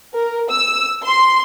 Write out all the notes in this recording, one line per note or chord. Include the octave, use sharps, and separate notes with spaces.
A#4
E6
C6